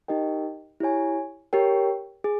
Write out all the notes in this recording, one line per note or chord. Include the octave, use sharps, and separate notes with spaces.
D#4 G4 A#4 D#5 G5
E4 G4 C#5 G#5
G4 A#4 C#5 G5
G#4